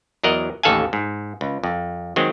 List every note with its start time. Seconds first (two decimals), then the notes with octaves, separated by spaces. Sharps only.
0.24 E2 F#3 A#4 D#5 F#5
0.63 A1 D#2 A4 F5 F#5 G#5
0.93 G#2
1.41 C#2
1.63 F2
2.16 D#3 F#3 G#3 C4